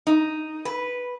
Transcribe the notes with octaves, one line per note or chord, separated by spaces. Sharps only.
D#4
B4